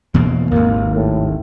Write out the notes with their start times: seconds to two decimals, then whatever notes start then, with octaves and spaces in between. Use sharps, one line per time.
0.14 E2 B2 A#3
0.51 G#1 D#2 A#3
0.95 A2